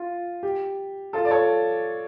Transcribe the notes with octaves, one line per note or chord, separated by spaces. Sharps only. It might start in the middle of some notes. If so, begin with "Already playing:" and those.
Already playing: F4
G4
F4 A4
D5
A4 C#5